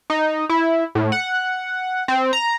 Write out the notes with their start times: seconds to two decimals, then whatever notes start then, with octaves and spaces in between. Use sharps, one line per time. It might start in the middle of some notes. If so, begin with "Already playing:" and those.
0.10 D#4
0.49 E4
0.95 A2
1.12 F#5
2.08 C4
2.33 A#5